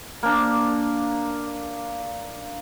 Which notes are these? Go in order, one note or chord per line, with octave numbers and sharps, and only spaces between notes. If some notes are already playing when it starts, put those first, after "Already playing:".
A#3 D4